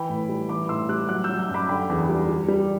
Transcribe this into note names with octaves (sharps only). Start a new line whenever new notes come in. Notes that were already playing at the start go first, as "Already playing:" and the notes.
Already playing: E3 G5 B5
A2
G3
E3 B5 D6
A2 C6 E6
G3 D6 F#6
F#3 D6 F#6
E6 G6
F#3
E6 G6
F#2
B5 D6
D3 G5 B5
E2
G3
G3
G3